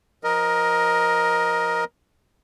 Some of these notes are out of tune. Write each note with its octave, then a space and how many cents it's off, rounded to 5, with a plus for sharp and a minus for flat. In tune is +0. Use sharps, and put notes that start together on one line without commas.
F3 +0 A#4 +15 D#5 +0